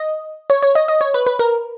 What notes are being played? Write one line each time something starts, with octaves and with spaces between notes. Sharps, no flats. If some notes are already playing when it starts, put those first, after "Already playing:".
Already playing: D#5
C#5
C#5
D#5
D#5
C#5
B4
B4
A#4